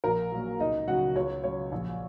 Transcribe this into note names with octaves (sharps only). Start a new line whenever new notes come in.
A#1 A#4
A#2 F#3
C#2 D#4 D#5
C#3 F#3 F#4 F#5
C#2 C#5
C#3 F#3 C#5
A#1